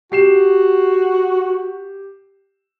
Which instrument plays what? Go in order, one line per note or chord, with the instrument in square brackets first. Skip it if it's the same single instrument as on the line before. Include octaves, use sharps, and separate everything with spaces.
[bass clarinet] F#4 [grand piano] G4 C7 E7